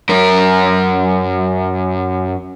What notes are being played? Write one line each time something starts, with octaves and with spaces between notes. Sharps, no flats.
F#2 A#4